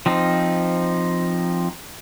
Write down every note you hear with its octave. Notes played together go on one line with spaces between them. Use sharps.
F3 C4 D#4